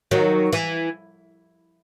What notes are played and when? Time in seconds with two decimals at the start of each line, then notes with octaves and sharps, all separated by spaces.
0.11 D#3 F#3
0.53 E3